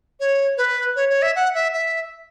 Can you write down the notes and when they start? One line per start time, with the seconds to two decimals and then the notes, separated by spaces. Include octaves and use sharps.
0.20 C#5
0.57 B4
0.96 C#5
1.10 C#5
1.22 E5
1.36 F#5
1.54 E5
1.73 E5